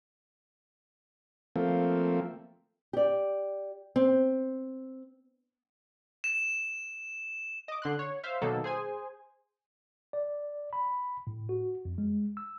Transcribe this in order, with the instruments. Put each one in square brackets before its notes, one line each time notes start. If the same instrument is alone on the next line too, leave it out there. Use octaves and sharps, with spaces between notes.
[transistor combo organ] F3 A3 A#3 C4
[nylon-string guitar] G4 D5
C4
[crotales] E7
[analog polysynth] D#5 D6
D3 C6 F#6
C#5
C5 E5 F5
B2 D#3 F#3 A#3 A4
G#4 C5 G#5
[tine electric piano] D5
B5
A2
F#4
F2
G#3
E6